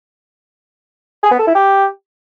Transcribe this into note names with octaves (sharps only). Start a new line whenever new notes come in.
G#4
B3
A4
E4
G4